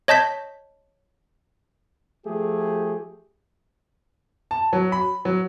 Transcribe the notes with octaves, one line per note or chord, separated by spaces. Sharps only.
C#5 D#5 A5 G6 B6
F3 A3 G4 G#4
A5
F#3
B5
F#3